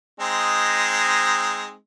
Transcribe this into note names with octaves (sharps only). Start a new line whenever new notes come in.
G#3 C4 D#4